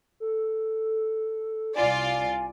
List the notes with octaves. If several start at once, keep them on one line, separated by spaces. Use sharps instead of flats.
A4
C2 F4 D5 G#5